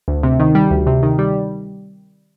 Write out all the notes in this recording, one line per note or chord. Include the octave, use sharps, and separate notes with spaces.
D2
C3
D#3
G3
D2
C3
D#3
G3